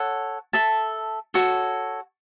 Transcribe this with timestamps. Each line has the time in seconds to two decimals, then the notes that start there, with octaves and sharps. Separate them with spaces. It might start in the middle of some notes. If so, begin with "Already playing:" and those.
Already playing: A4 C#5 F#5
0.53 A4 E5 A5
1.34 F#4 A4 C#5